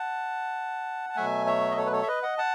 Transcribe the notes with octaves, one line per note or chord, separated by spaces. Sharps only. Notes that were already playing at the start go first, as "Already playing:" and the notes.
Already playing: F#5 A5
A5
B2 F#3 A3 E5 G#5
C#5 E5
D#5
A4 C#5
B4
A4 C#5
E5
B4 D#5
D#5 F#5
F#5 A5